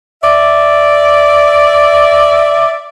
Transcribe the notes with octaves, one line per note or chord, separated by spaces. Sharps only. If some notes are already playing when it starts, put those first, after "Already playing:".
D5 E5